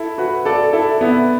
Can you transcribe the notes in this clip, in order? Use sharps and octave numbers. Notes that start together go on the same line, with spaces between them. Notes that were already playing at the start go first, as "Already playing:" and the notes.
Already playing: E4 A4
F#4 B4
A4 D5
E4 A4
B3 E4